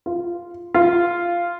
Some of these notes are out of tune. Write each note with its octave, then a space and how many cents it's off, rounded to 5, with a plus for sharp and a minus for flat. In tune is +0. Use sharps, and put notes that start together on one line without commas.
F4 -10
F4 -10